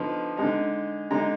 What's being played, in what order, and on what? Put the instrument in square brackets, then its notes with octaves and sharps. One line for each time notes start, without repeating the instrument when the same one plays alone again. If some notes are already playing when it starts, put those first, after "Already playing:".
Already playing: [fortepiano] D3 F3 B3 D#4
D3 G#3 D#4
D3 G#3 D#4 A#5